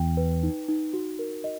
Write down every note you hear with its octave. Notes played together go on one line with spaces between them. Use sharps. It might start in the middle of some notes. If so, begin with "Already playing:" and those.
Already playing: E2 G5
B4
D#4
D#4
F#4
A#4
D#5